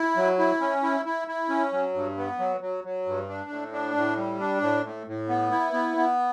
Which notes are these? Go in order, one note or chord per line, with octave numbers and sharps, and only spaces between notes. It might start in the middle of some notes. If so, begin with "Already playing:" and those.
Already playing: E4
F#3
E4
C#4
E4
E4
E4
C#4
F#3
G2
B3
F#3
F#3
F#3
G2
D4
A2
D4
A2
G3
D4
A2
A2
A2
B3
E4
B3
B3